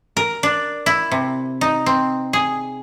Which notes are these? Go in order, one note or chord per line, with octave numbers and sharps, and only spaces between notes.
A#4
D4
E4
C3
D#4
C4
G#4